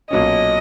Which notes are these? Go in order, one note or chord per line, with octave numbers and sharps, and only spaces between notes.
B1 A#2 F#3 A#3 C#4 D#5